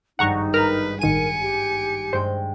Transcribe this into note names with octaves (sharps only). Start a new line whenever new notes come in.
G#1 G2 G3 D#4 F#5 A#5 C#6
A#4 B4 A#5 F6
A1 D#3 A#4 G#5 C#7 D#7
G4
G2 G#3 C5 G5